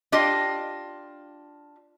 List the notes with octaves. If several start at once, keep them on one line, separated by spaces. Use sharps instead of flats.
D4 F4 G4 D#5